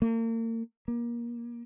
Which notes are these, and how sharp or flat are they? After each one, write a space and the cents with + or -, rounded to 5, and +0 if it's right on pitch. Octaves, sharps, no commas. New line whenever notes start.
A#3 -40
A#3 +25